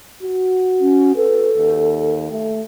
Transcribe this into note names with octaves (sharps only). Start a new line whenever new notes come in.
F#4
C#4
A4 B4
D#2
A3